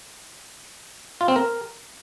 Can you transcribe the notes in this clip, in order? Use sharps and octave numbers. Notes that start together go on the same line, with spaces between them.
F4
C4
A#4